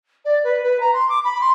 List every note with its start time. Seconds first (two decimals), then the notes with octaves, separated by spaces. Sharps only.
0.25 D5
0.44 B4
0.63 B4
0.80 A#5
0.93 C6
1.08 D6
1.24 B5
1.40 C6